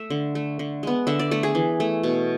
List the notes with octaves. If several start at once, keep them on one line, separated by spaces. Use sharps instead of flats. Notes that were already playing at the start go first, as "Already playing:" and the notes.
Already playing: A3 E5
D3
A3
D3
G#3 B3
D3 E5
D5
A3 D5
G#4
E3
A3
B2